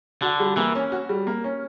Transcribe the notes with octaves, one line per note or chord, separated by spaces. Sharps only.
D3 F#4
G3
E3 A#3
C#4
F#4
G3
A#3
C#4